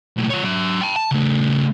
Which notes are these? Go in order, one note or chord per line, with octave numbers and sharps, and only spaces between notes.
B1 A2
F3 C#5
F#3 E5
G5 A5
A5
C#3 A3